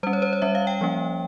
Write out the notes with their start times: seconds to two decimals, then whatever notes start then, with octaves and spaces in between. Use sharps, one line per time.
0.03 G3 C#4 C5
0.13 C#5
0.22 C5
0.33 C#5
0.42 G3 C#4 E5
0.55 F5
0.67 G5
0.81 F3 A#3 C#4